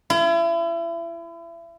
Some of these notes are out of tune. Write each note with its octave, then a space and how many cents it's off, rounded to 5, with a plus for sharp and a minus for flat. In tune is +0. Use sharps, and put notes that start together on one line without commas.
E4 +35